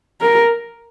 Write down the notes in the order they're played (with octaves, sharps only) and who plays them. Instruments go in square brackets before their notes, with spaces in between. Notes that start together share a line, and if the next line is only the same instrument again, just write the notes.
[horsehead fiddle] A#4